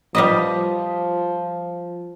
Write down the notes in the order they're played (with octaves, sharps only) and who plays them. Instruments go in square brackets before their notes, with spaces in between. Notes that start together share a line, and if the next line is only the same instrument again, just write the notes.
[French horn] F3 [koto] G3 B4 D#5